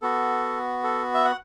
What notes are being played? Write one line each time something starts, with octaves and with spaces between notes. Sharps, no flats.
B3 F#4 A4
A4
E5
F#5